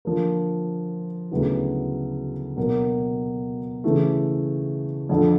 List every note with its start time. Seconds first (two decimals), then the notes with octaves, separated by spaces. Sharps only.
0.05 D3 F3 A#3
1.31 D2 C#3 F#3 B3 E4
2.57 B2 F#3 A#3
3.84 C#3 E3 A3
5.09 F2 D3 F3